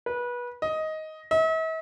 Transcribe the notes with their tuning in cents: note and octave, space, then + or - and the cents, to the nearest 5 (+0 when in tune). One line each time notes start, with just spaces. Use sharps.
B4 -25
D#5 +10
E5 -45